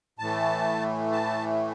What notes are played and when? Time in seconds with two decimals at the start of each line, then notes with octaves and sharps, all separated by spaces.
0.19 A2 E3 A3 A5
1.12 A5